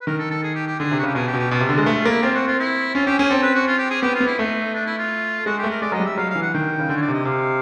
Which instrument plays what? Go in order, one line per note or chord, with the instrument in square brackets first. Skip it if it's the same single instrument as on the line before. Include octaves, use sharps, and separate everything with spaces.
[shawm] B4
[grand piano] D#3 [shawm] A#4
[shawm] A4
A4
G#4
G4
G4
[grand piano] D3 [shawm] G#4
[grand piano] C3
[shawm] F#4
[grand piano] C#3 [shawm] G4
[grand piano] B2 [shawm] G#4
[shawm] G4
[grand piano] B2
[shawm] G4
[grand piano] B2 [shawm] F4
[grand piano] C3
D3
G#3
A3
[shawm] F4
[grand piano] A#3
[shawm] E4
[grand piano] C4 [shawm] F4
[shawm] F#4
F4
E4
[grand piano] C#4 [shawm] F4
[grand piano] C#4 [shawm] G4
[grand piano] C#4 [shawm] G#4
[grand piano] C4 [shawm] A4
[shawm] B4
F#4
F4
G4
G#4
[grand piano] B3 [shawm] G4
[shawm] F4
[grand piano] B3
[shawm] E4
[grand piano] A3 [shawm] D#4
[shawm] D4
E4
F4
[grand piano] G#3 [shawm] F#4
[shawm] G4
[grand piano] A3
[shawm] A#4
[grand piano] G#3 [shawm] D5
[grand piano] F#3 [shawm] D#5
[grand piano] G3
[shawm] E5
[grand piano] F#3 [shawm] F5
[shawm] F5
[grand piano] E3
[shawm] F#5
[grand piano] D#3 [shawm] G5
[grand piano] C#3
[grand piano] D3 [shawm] G5
[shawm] C#5
D5
[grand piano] C3
[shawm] D#5
[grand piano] C3 [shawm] F5